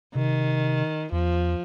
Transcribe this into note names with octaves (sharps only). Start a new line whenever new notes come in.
C3 D#3
E2 F3